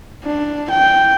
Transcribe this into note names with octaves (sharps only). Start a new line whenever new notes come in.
D4
G5